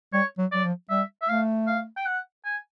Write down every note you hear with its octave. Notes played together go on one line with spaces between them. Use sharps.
G3 C#5
F#3
F#3 D5
F3
G3 E5
E5
A3 F5
F5
G5
F#5
G#5